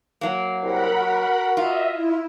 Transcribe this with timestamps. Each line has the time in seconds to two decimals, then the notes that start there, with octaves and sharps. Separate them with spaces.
0.21 F#3 A#3
0.62 C2 A#4 F#5 B5
1.02 F#4
1.57 F4 D#5 E5
1.92 E4